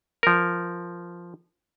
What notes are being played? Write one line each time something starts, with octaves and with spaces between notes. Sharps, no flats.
F3 A#4